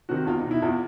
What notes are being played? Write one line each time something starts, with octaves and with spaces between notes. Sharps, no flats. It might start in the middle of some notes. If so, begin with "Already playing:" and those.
C3 D#3 F#4
E2 F4
D#4
B2
E4
E2 F4